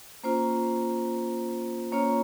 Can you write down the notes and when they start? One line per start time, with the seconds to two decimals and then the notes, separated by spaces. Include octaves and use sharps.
0.24 A#3 C#4 F4 C5
1.92 A#3 C#4 F4 C#5